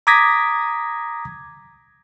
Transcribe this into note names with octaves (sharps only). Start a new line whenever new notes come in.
A#5 D6 D#6 G#6 A#6 B6